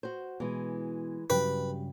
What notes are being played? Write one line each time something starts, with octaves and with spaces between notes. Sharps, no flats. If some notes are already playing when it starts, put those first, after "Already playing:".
F#4 C5
B2 E3 G#3
G2 C#3 F#3 G4 B4